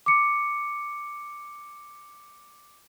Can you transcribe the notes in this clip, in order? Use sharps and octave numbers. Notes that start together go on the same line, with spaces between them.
D6 C#7